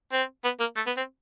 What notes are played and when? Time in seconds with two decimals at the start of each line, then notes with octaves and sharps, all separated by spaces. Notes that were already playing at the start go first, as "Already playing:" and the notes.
0.13 C4
0.44 B3
0.60 A#3
0.76 A3
0.87 B3
0.97 C4